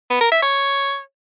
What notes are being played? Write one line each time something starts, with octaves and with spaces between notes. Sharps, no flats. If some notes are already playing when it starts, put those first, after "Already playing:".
B3
A#4
E5
C#5